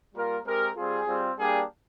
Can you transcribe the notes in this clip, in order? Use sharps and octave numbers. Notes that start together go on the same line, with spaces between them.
G3 A#3 F4 A#4
G#3 C4 G4 A#4
G3 C4 F4 G#4
G3 C4 F4
G3 A#3 D4 G4 G#4